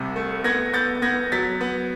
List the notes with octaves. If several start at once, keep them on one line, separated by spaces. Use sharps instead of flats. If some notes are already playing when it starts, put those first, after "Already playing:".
Already playing: C2 C3
A3
B3 G#6 A#6
B3 G6 A6
B3 G#6 A#6
F#3 A6 B6
B3